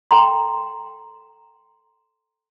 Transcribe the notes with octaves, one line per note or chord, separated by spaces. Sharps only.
A4 G5 A#5 C6